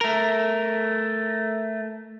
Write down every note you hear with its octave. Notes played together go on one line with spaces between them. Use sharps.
A3 A#4